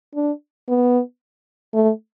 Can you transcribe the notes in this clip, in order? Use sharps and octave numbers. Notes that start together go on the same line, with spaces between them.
D4
B3
A3